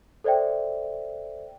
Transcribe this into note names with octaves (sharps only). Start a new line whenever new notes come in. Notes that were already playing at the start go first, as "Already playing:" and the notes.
A4 C5 D5 E5 G5